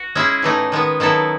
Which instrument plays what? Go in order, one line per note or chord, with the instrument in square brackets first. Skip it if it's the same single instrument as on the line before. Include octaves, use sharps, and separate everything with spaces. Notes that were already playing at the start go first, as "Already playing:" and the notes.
Already playing: [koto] F#4
G#3 C#4 E4 G#4
A2 E3 A3 D#4
D#3 G#3 B3
D#3 F#3 B3 E4 A4